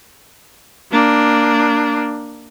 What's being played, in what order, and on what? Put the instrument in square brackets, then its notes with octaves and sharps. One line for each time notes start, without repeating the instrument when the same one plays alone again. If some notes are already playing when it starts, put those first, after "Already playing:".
[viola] A#3 D4